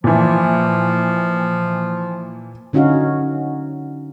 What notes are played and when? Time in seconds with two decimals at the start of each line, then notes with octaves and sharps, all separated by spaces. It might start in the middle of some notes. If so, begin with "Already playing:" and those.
0.04 A#2 E3 F3
2.73 D3 C#4 D#4 F#4 F5